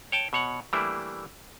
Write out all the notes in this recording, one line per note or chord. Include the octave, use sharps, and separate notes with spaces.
C#5 G5 A5
B2 C#5 F#5
E3 G3 A3 A#3 D4 E4